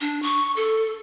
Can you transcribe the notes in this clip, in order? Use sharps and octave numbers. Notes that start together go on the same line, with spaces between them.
D4
C#6
A4